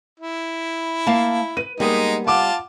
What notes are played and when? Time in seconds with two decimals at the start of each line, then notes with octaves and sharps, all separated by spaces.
0.20 E4
1.07 A#3 F5 A5
1.57 B4 D#7
1.80 G3 G#3 A#3 B3 D#4
2.27 F4 F#5 A5 D6